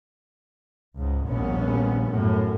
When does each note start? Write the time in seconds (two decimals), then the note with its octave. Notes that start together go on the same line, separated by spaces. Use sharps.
0.97 C#2 G#2
1.26 A#1 D#2 G3 B3 C#4
2.11 F#2 A2